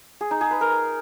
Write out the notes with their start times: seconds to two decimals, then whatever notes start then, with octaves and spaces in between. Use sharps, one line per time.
0.21 G#4
0.31 D#4
0.41 G#4
0.51 B4
0.61 A#4